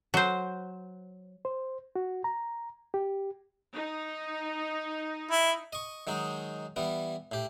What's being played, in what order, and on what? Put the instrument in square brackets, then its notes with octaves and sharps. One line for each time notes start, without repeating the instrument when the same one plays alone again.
[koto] F#3 C5
[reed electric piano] C5
F#4
A#5
G4
[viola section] D#4
[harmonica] E4
[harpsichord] D#5 C#6
D#3 F#3 G#3 D#4
E3 G3 B3
A2 G4